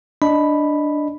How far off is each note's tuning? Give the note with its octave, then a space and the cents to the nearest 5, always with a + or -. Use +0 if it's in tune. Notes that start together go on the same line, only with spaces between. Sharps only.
D4 +0 D#5 +0 B5 +0